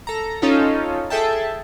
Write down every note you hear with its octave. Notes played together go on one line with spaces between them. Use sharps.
A4 A#5
C#4 D#4 F4 A4
G#4 A4 E5 G5 A5